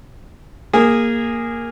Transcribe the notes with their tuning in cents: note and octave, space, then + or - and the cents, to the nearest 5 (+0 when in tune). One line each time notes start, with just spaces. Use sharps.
A#3 +0 G#4 -15